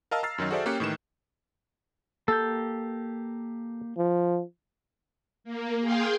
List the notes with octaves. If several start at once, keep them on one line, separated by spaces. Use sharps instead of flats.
A#4 D#5 F5 A5 E6 F6
A#5 E6 F6 A6 C7
F#2 D#3 F#3 D#4
F#4 G#4 A4 C5 D5 E5
A#3 C#4 G4 G5 F#6 C#7
A2 D#3 E3 E7
A#3 G4 A4 G6
F3
A#3
G#4 F5 G5 C6